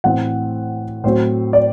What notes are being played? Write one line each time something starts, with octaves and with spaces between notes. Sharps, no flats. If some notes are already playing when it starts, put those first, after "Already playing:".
A2 E3 A3 C4 F#5
A2 F#3 C4 C5
D5